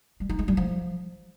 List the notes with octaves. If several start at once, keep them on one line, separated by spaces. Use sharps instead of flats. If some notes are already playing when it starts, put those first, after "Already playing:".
G3
D#4
G#3
G3
F3